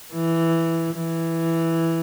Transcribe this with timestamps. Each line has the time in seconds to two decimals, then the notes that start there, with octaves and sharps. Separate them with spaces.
0.13 E3
0.95 E3